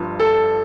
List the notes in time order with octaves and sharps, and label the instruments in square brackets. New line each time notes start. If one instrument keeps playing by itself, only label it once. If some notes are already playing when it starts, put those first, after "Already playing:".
Already playing: [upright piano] G1 G2 F3
[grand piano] A4